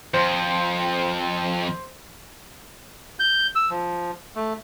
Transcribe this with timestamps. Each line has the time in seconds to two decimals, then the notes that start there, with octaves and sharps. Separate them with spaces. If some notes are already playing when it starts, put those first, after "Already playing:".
0.14 F2 C5
3.19 G6
3.55 E6
3.70 F3
4.36 A3